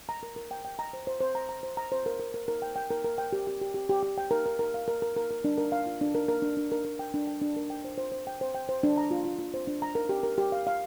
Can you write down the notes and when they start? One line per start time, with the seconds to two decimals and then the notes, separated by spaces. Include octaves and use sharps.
0.09 A#5
0.23 A#4
0.36 A#4
0.51 G5
0.65 G5
0.79 A#5
0.93 C5
1.07 C5
1.20 C5
1.35 A#5
1.49 A#5
1.63 C5
1.77 A#5
1.92 C5
2.06 A#4
2.20 A#4
2.34 A#4
2.48 A#4
2.62 G5
2.76 G5
2.90 A#4
3.04 A#4
3.18 G5
3.33 G4
3.47 G4
3.61 G4
3.74 G4
3.89 G4
4.03 G4
4.18 G5
4.31 A#4
4.46 A#4
4.59 A#4
4.74 F5
4.88 A#4
5.02 A#4
5.17 A#4
5.31 A#4
5.44 D4
5.58 A#4
5.72 F5
5.86 F4
6.01 D4
6.15 A#4
6.28 A#4
6.42 D4
6.57 D4
6.72 A#4
6.85 A#4
6.99 G5
7.14 D4
7.27 G5
7.41 D4
7.56 A#4
7.70 G5
7.84 C5
7.98 C5
8.12 C5
8.27 G5
8.41 C5
8.55 G5
8.69 C5
8.83 D4
8.97 A#5
9.11 F4
9.25 F4
9.39 F4
9.54 C5
9.67 D4
9.82 A#5
9.95 A#4
10.09 G4
10.23 A#4
10.38 G4
10.52 F5
10.67 F5